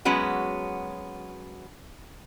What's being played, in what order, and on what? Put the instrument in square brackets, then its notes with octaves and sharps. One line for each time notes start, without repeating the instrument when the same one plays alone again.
[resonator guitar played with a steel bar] F#3 G#3 B3 C#4 F#4